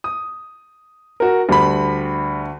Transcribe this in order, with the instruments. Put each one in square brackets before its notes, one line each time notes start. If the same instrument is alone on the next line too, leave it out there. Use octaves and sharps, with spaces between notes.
[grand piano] D#6
F#4 A#4
[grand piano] D2 [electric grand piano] G3 B5